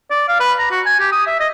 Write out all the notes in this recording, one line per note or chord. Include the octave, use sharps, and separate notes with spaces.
D5
F5
B4
A#5
F#4
G#5
G4
D#6
E5
D#5